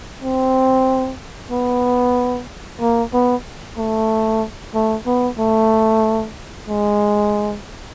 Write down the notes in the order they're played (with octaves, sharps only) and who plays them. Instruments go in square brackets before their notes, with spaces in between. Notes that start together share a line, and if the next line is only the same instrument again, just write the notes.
[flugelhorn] C4
B3
A#3
B3
A3
A3
B3
A3
G#3